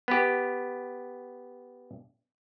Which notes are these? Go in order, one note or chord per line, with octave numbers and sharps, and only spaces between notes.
B3 G4